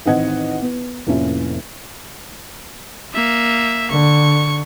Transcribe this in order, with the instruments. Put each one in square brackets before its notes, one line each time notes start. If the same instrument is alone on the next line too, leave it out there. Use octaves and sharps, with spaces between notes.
[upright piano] A1 D#3 C4 D#5 F#5 G#6
B3
F1 A2 A#3 C#4 E4 F4
[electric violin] A#3 E5
[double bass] D3 [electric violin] C#6